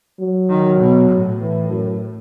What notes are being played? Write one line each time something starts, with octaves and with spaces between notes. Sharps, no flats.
F#3
D#3
B2
A2
E3
F#2